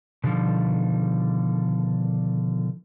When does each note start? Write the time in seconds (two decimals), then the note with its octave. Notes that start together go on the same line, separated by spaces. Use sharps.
0.24 B2 D3 D#3 F3 G3